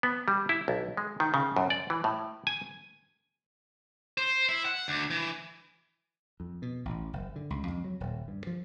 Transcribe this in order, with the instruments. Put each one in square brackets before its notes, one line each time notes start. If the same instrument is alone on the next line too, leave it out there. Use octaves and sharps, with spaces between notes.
[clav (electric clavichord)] B3
G3
E4
B1
G#3
D#3
C#3
F#2
D5
E3
A2
G#5
[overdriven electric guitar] C5
E4
F#5
D2
E3
[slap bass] F2
B2
A1
F#1
D3
C#2
F2
F#3
D#1
G2
F3